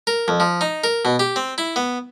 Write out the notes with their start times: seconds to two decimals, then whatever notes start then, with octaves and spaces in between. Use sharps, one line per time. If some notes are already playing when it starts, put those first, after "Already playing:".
0.07 A#4
0.28 F2
0.40 F3
0.61 D#4
0.84 A#4
1.05 B2
1.19 G4
1.36 C4
1.58 E4
1.76 B3